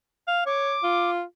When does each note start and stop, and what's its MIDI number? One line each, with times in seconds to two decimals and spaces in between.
0.28 0.45 77
0.46 0.77 73
0.46 1.10 86
0.83 1.23 65